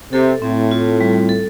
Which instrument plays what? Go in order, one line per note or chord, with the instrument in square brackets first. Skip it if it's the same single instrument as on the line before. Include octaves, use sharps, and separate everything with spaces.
[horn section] C3 [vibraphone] A4
[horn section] A2 [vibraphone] C4
[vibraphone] F4
G3
A4